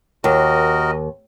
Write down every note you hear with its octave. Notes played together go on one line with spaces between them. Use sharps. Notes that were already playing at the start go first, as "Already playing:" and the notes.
D#2 F#4 A#4 D#5